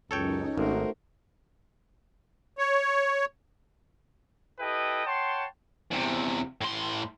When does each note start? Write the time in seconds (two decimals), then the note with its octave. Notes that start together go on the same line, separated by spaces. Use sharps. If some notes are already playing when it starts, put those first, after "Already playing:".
0.11 C#2 F#2 C#4 D#4 A4 C#5 G5
0.58 G#1 A3 F#4 A#4 C5
2.58 C#5
4.60 E4 G4 A4 B4 D#5 G5
5.05 C#5 F#5 G5 A5 C6
5.91 E2 C3
6.61 A2 C6